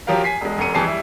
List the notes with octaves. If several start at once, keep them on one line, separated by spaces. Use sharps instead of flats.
F3 F#3 G4 A#4 F5
G#5 B6 C7
E1 G#3
F1 F#2 A#5 C#7 D#7
F2 E3 G3 G#4 A5 C7
G3 E4